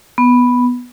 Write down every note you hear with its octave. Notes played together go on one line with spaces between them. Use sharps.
B3